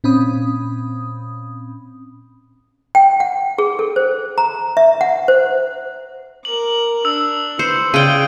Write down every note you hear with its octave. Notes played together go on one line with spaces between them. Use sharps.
A#2 C4 C#4 B5 D#6
G5
F#5
G#4
A4
C5
A#5
E5
F#5
C5
A#4 D6 F#7
D4 E6
B4 C5 C#7
C#3 D5 F5 G5 D#7 G7